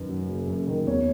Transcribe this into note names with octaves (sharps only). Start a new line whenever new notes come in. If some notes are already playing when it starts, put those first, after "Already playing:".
Already playing: F#2 D#3 B4
F#3
F#1
F#2
D#3
E2 C#5